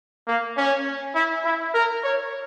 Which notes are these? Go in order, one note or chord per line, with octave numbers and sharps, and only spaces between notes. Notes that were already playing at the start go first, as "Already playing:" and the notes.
A#3
C#4
E4
E4
A#4
C#5